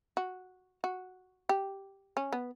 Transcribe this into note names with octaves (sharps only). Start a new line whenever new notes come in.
F#4
F#4
G4
C#4
B3